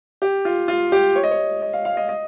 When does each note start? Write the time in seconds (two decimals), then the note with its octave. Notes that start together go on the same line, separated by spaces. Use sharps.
0.22 G4
0.45 F4
0.68 F4
0.92 G4
1.15 C#5
1.23 D#5
1.31 C#5
1.62 D#5
1.73 F5
1.85 F5
1.97 D#5
2.09 D#5